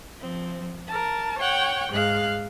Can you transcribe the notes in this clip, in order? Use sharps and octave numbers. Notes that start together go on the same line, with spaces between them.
F3 C4
A#4 A5
C#5 F#5 G5
G#2 G#3 F5 F#6